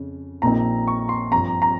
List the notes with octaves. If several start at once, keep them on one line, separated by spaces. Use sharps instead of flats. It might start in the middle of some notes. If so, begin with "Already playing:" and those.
Already playing: F2 C#3
A#1 A#2 F3 C4 D#4 A#5
C#6
C6
G2 F3 C4 A#5
A#5